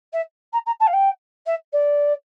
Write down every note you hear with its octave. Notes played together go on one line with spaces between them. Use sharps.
E5
A#5
A#5
A5
F5
G5
E5
D5